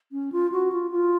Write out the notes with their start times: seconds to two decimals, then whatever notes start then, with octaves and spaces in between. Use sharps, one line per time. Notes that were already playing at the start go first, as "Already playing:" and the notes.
0.12 C#4
0.32 F4
0.52 F#4
0.72 F4
0.91 F4